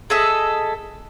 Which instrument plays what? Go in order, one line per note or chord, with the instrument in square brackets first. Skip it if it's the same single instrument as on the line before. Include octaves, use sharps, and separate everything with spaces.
[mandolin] G#4 A4 D#5 E5